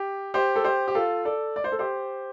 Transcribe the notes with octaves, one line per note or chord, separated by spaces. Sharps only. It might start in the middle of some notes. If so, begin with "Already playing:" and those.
Already playing: G4
G4 C5
A4
G4 C5
G4
F4 A4
A4 D5
D5
C5
A4
G4 C5